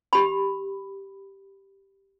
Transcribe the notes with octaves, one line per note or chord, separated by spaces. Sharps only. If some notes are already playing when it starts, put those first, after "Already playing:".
G4 B5